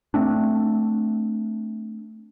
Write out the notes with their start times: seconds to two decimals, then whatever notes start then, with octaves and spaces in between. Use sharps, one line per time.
0.14 A3 C4 D4